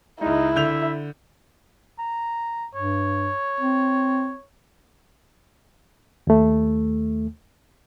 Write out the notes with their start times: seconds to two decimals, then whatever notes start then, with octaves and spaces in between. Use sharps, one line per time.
0.21 C#2 G#3 D#4 E4
0.56 D3 E5 G6 F7
1.99 A#5
2.75 G2 C#5
3.60 C4
6.27 D#2 A3